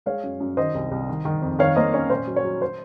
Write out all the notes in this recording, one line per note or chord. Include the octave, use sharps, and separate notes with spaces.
G#3 C#5 F5
F#2
F#2
D#3 C5 D#5
C2
C2
D#3
D#3
F2
D#3 C#5 F5
A#3 C5 D#5
C#4 C#5
A#2 C5
F#3
C#5
F#3
C5